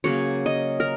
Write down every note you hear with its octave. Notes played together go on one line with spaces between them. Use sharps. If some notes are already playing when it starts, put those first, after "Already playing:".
C#3 F#3 A#3 C#5
D#5
A#4